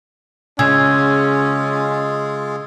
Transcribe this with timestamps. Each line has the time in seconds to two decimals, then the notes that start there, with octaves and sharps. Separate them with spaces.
0.59 C#3 G#3 C#4 F4 G#4 G#5 E6 G#6